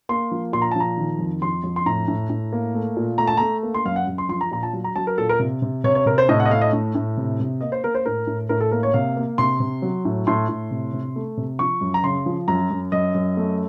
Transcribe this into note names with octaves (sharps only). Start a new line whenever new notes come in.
A#3 C6
F3
A#2 C6
A#5
A5
F3 A#5
D#3
F2
F2 C6
F2
C6
A2 A#5
A2
A2
A#3
A3
A#2
A3 A#5
A5
A3 A#5
A#3
C6
F#2 F5
F#5
F#2
C6
F3 C6
A#5
A#2 A#5
A5
F#3
A#5
F#3 A5
A#4
A#2 A4
A#4
C3
C3
C3 C#5
C#5
C3 A#4
C5
A2 D#5
F#5
D#5
A3 F5
D#5
A2
A2
C3
C3
A#3 D#5
C5
A#3 A#4
C5
A2 A#4
A2
A2 A#4
A4
A#3 A#4
C#5
C3 F5
A#3
C3 C6
C3
F#3
A2
A2 C6
A2
C3
C3
A3
C3
F3 C#6
F#2
A#5
C#3 C6
F3
F#2 A#5
F#2
F#2 D#5
F#2
A3